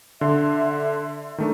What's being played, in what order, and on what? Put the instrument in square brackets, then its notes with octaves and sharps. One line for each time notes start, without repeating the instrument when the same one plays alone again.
[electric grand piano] D3 C6 [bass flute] E5
[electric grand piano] D#3 A3 D4